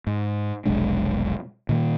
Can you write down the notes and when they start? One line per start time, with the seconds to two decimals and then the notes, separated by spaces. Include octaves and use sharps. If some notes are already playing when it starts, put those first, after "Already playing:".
0.07 G#2
0.65 F1 B1 G#3 D4
1.69 A#2 D#3 A#3